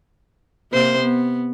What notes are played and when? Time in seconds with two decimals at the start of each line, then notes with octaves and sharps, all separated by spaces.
0.72 C3 A#3 C5
1.01 B3